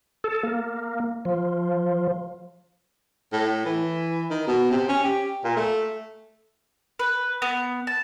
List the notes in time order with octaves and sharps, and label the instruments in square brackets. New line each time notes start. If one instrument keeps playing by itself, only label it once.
[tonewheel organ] A4
A#3
F3
[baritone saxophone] A2
E3
D#3
B2
C3
C#4
G4
A#2
A3
[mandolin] B4
B3
A5